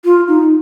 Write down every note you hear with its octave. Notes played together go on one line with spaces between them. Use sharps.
F4
D#4